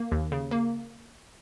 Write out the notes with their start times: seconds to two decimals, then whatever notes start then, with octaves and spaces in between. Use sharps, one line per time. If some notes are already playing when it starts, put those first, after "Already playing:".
Already playing: A#3
0.12 D#2
0.32 C#3
0.51 A#3